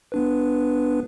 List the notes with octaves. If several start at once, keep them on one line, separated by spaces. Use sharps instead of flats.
B3 D4 B4